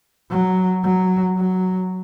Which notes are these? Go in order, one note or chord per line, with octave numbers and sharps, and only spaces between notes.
F#3
F#3
F#3